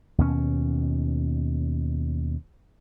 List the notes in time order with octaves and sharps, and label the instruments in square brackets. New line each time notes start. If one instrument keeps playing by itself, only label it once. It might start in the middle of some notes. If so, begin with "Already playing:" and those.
[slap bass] D#2 B2 C#4